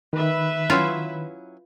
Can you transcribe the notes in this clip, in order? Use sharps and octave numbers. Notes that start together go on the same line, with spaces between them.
D#3 B4 E5
F#3 C#4 E4 F4